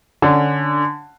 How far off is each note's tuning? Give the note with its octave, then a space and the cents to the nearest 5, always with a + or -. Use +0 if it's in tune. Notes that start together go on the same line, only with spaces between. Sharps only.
D3 +0 C#4 +10